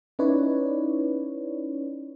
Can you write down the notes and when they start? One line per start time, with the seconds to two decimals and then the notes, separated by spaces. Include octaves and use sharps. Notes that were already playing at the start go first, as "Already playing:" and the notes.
0.19 C#4 D#4 E4 B4 C#5 D5